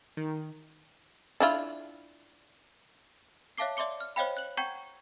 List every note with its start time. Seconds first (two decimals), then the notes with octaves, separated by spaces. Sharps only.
0.17 D#3
1.40 D4 E4 F4
3.58 C#5 E5 F5 A5 D6 C7
3.77 D5 E5 C6 D6 C#7
4.00 F6
4.16 C5 C#5 D#5 F5 G5 B5
4.37 F#6 F#7
4.57 F#5 G5 A#5 C#6 G6 G#6